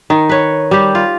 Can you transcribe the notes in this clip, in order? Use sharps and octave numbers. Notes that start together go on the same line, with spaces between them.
D#3
B4 C#5
G3 G4
F4